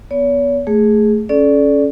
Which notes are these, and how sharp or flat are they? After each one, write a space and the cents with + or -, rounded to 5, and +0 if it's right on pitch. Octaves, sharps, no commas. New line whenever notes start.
B3 +0 C#5 +40
A3 +0 G#4 +0
C#4 +0 A4 -25 D5 -5